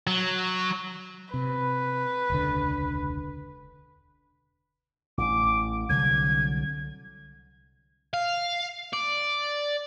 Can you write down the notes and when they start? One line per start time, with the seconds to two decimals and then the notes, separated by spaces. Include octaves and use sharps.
0.07 F#3
1.34 C3 B4
2.30 E1 C#2 D3
5.18 A1 D6
5.89 C2 D3 F#3 G#6
8.13 F5
8.93 D5